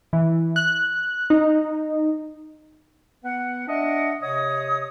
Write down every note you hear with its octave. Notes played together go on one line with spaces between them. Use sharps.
E3
F#6
D#4
B3 B4 F#5
D4 D#5 E5 F#5
C3 C#5 D#5 D#6